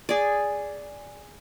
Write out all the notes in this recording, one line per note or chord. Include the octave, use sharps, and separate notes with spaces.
G#4 D5